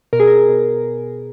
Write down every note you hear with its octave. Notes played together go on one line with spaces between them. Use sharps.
B2 A#4
G#4
A#4
B2